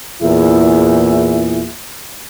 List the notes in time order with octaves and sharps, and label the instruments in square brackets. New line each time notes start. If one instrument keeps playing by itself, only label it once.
[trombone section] E2 A#2 E4 G#4